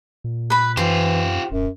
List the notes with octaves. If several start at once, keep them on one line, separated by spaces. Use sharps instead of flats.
A#2
B4 B5
F#2 E3 F4 G4 C5
D#1 F#2